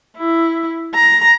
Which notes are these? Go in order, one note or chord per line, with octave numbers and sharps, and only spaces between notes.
E4
A#5